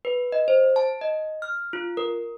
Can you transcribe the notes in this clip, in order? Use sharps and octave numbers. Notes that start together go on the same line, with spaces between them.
B4
D#5
C5
A5
D#5
F6
F4
A#4